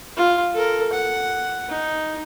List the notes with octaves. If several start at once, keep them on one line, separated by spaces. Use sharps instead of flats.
F4
A4 A#4
F#5
D#4